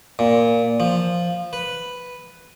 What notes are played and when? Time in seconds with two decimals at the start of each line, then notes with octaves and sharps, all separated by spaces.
0.19 A#2
0.80 F3
1.53 B4